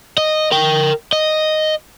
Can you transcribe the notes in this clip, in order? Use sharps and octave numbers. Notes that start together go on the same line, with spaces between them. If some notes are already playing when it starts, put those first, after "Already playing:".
D#5
A#4 G5
D#5